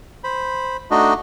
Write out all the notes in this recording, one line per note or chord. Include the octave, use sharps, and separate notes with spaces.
C5 B5
A3 D4 D#4 F#4 D#5